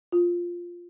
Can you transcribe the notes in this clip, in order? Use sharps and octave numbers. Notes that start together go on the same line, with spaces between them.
F4